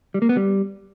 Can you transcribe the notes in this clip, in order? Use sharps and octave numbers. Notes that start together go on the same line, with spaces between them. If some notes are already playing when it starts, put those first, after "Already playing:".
G3
A#3
B3
G3